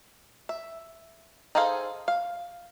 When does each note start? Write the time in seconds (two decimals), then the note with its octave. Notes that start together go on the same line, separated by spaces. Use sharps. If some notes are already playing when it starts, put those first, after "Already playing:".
0.49 E5
1.55 D#4 G#4 A4 C5 F5
2.08 F5